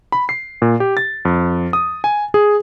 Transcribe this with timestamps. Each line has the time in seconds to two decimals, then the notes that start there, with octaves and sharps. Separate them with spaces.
0.12 B5
0.29 C7
0.62 A#2
0.80 G4
0.97 A6
1.25 F2
1.73 D#6
2.04 G#5
2.34 G#4